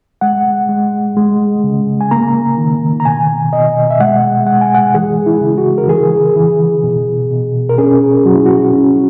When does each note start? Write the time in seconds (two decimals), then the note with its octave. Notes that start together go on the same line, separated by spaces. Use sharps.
0.21 G#3 F#5
0.69 G#3
1.17 G#3
1.64 C#3
2.01 G#5
2.11 A#3 A#5
2.57 D#3
3.00 A#5
3.05 B2 G#5
3.53 B2 D#5
3.91 E5
4.00 G#3 F#5
4.47 G#3 F#5
4.61 G#5
4.75 F#5
4.95 E3 G#4
5.26 E4
5.41 C#3
5.58 F#4
5.78 A#4
5.88 E3 G#4
6.36 E3
6.84 B2
7.31 B2
7.69 A#4
7.78 C#4 G#4
8.25 F#3 F#4
8.35 E4
8.46 F#4
8.73 C#4